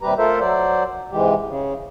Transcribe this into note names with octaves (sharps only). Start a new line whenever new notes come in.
D#2 C3 G3 G4 B4 A#5
A3 F4 A4 A#4 C5 E5
F#3 C5 D5
G#2 C3 E3 G#3 G4
C#3